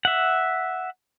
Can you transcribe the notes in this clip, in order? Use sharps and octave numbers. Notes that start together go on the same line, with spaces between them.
E5 F#5